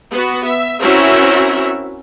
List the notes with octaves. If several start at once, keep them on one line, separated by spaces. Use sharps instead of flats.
B3 F#4
E5
C4 C#4 E4 F#4 A#4 E5